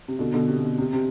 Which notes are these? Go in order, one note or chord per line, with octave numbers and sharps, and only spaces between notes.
C3
B2 D3
B2 D3
C3
B2
C3
C3